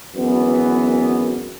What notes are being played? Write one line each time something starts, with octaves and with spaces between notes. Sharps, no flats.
G#1 F#2 E3 B3